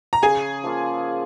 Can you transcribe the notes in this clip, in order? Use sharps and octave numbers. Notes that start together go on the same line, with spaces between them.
A#5
C#3 G#4 G#5
F3 A#3 F4